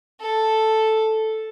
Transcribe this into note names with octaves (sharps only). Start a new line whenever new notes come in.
A4